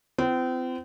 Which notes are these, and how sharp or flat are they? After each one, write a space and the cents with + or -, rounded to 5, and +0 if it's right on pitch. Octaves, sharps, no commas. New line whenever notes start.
C4 -35 F4 -45